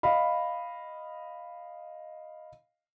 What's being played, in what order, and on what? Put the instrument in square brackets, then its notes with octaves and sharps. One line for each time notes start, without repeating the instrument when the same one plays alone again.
[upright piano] D#5 F5 B5